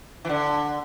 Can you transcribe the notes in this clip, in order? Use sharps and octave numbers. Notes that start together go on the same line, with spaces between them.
E3
D3